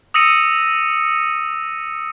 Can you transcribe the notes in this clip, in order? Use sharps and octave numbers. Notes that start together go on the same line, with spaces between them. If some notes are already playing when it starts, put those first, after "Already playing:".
D#6 E6 A#6 C#7 D#7